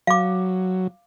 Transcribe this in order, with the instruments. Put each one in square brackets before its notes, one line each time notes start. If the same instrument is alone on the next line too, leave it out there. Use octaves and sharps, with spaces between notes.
[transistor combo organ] F#3 [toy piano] F5 D6